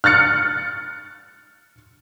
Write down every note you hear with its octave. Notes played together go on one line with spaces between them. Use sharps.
F6 F#6 A6 C#7